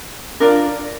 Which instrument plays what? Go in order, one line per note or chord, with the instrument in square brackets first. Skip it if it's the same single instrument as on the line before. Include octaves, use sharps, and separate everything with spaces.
[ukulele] D4 F4 A#4 D5